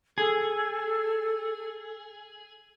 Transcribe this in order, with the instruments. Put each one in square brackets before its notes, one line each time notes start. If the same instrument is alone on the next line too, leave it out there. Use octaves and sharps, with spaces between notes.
[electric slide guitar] G#4 [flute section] A4